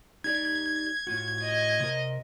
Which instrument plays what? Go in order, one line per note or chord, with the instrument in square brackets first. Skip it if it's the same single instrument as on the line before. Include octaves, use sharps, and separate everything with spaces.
[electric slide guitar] D#4 G4 D5 [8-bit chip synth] G#6
[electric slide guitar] A2 F4 F#4
[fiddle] D#5
[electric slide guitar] C3 A#4